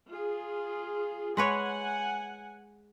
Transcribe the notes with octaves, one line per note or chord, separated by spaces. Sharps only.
F4 G#4
G#3 B4 C#5 F#5 G#5